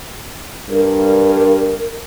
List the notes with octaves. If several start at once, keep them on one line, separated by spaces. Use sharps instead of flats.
G2 A#4